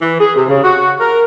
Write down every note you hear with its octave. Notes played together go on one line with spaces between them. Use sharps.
E3
G#4
C3
C#3
F#4
A#4